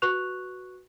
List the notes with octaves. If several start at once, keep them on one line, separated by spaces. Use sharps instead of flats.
F#4 B4 C#6 F#6 F7